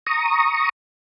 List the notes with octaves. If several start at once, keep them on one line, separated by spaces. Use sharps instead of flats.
A#5 C#6 D#6